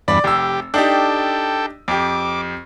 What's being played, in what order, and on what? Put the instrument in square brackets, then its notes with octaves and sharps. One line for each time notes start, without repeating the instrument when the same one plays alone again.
[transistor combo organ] E2 G2 B5 [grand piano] D5
[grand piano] F1 E6 [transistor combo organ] G4
[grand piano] D4 D#4 G4 [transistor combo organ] A4 G5
[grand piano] F2 G4 [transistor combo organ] D6